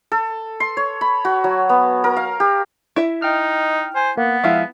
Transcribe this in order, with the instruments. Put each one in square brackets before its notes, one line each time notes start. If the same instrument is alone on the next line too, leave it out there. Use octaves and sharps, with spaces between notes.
[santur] A4
C6
C#5
B5
F#4
F#3
B3
A#4
F5
G4
[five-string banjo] E4 E5
[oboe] D#4 [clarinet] D#5 [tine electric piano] G5 F6
[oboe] C5 [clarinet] G#5
[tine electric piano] A#3 [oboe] B3 [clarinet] F#5
[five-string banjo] F3 G#3 E4 [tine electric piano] E5 F5